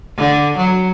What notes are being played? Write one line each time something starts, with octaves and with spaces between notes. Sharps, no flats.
D3
F#3